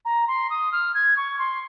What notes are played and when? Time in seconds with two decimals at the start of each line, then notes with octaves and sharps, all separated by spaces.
0.05 A#5
0.28 C6
0.50 D#6
0.72 F6
0.94 G#6
1.17 C#6
1.39 C6